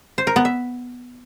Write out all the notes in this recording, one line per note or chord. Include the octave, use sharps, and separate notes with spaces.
C5
A#4
B3
E5